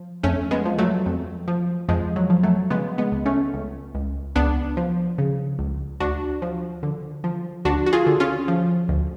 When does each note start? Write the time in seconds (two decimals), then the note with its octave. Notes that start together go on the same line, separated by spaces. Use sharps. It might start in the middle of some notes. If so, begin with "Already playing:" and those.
Already playing: F3
0.23 F2 A3 C#4
0.51 G#3 B3
0.65 F3
0.78 F#3 A3
1.06 F2
1.48 F3
1.89 F2 F3 G#3
2.16 F#3
2.30 F3
2.43 F#3 A3
2.70 C#3 G#3 B3
2.98 G#3 B3
3.12 C#2
3.26 A3 C#4
3.53 C#2
3.94 C#2
4.36 C#2 B3 D4
4.77 F3
5.18 C#3
5.59 C#2
6.00 D2 D4 F#4
6.42 F3
6.83 D3
7.24 F3
7.65 D2 D4 F#4
7.86 F#4
7.93 F4 G#4
8.07 D3
8.20 C#4 F4
8.48 F3
8.89 D2